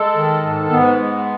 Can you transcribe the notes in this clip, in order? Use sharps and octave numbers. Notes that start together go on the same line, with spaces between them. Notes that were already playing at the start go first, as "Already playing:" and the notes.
Already playing: G#3 A4
D#3
G#2
G#2 B3
G#3